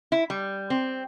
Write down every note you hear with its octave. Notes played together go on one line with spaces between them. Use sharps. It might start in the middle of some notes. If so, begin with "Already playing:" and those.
E4
G3
C4